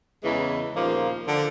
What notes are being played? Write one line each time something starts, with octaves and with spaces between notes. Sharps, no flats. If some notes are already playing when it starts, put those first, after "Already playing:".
E2 C#3 E3 G#3
D#2 A#2 C#3 F3 A#3
D3 F3